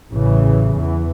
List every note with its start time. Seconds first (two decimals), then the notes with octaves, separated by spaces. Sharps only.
0.13 A1 C#3 E3
0.79 E2 E3